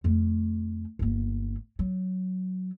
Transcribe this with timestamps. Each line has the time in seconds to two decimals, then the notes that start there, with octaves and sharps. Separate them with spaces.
0.04 F2 A3
0.99 G1 A#3
1.79 F#3